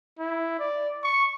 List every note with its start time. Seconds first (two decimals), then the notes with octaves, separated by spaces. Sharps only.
0.19 E4
0.59 D5
1.03 C#6